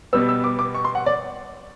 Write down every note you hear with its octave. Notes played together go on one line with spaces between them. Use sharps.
B2 G3 B3 E6
E6
D6
D6
C#6
C6
F#5
D5